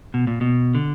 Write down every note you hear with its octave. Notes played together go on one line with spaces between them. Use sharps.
B2
A#2
B2
D3